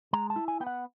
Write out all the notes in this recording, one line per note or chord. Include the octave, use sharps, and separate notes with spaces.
G#3 A#5
A5
E4
G#5
B3 G5
F#5